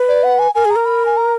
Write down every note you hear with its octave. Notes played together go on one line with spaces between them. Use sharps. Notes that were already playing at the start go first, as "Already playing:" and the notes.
Already playing: B4
D5
F#5
G#5
A#4 G#5
G#4
A#5
A#4
B5
G#5
A#5